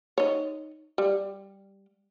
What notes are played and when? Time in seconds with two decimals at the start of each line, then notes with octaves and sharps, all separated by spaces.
0.18 D#4 C#5
0.98 G3